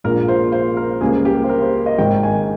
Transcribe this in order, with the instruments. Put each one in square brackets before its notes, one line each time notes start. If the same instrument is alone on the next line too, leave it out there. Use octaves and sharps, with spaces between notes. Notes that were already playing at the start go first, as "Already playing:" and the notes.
[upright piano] A#1 A#2 G#3 A#4
C5
C5
A#4
C#2 C#3 G3 A#3 G#4
G4
C5
A#4
C5
D#5
G#1 G#2 D#3 G5
G#5